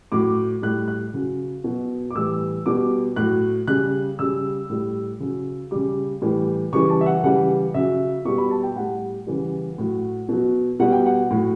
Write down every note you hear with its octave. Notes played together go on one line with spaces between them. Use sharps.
A2 F#3 D6
A2 G3 F#6
F#6
C#3 F#3
B2 F#3
D6
A2 E3 G3 E6
B2 G3 D6
A2 F#3 F#6
C#3 G3 F#6
C#3 G3 E6
A2 G3
C#3 F#3
C#3 G3 D6
A2 E3 G3
C#3 E3 G3 C#6
A5
E5
F#5
C#3 E3 G3 F#5
C#3 F#3 E5
B2 G3 C#6
B5
A5
G5
A2 G3 F#5
C#3 E3 G3
A2 F#3
B2 F#3
B2 G3 F#5
G5
F#5
A2 F#3